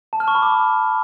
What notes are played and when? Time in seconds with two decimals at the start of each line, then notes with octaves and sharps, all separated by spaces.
0.13 A5
0.20 F6
0.28 C#6
0.35 B5
0.42 D6